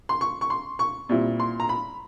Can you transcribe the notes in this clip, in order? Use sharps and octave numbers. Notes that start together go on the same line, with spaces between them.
C6
C#6
C#6
C6
C#6
A#2 G3 C4 E4
C6
A#5
B5